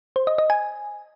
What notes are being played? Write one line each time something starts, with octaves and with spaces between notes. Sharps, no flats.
C5
D#5
D#5
G#5